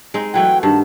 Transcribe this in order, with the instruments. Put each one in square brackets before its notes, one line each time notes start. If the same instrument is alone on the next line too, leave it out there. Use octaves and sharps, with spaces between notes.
[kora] G#3 C4 D#4
[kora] E3 F#3 A3 [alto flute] G5
[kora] G2 D#3 [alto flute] A5